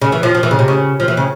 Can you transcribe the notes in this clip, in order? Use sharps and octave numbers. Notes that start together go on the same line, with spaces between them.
C#3
E3
F3
F3
E3
C#3
C3
C#3
F3
E3
C#3